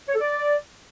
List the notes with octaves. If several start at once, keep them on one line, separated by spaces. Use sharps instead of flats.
C#5
A4
D5